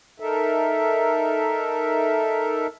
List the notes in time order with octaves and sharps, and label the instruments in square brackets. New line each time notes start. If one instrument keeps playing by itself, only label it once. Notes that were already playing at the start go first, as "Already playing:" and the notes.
[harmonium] D#4 A4 A#4 E5